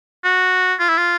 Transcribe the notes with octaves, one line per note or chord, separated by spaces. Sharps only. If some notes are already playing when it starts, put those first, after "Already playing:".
F#4
F4
E4
F4